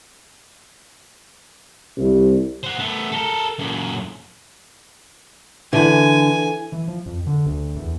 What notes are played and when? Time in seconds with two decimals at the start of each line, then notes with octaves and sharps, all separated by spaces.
1.97 C2
2.63 C5 F#5
2.79 A3 B3
3.12 A4 A#4
3.59 F#2 A#2
5.73 D3 E3 G#5
6.72 E3
6.88 F3
7.06 F2
7.27 D3
7.46 D2
7.76 E2